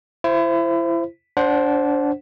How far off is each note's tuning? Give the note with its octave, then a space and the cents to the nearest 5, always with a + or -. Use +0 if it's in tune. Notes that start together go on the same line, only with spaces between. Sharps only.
E4 +30 C5 +0
D4 -20 C5 +10 F#5 +0